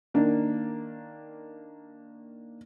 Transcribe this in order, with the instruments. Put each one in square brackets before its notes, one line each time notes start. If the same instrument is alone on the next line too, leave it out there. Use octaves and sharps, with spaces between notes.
[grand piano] D#3 A#3 D4